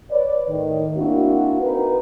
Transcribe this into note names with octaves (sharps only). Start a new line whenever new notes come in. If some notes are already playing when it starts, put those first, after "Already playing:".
B4 C#5 D5
A2 D#3
A#3 C4 D4 E4 F#4
C4 D#4 F#4 A#4 B4